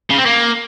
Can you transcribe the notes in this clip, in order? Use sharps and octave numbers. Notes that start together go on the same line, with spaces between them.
C#3
C4
A#3